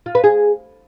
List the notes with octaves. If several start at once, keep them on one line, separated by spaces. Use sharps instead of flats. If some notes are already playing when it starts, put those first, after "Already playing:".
F4
B4
G#4